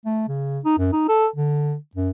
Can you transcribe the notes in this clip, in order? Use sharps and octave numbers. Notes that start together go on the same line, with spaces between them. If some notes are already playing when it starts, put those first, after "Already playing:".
A3
C#3
D#4
F#2
D#4
A4
D3
F#2